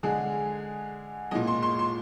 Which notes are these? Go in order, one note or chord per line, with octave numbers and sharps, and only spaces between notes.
D3 G#3 G#4
A#2 G#3 D#5
C6
C6
C6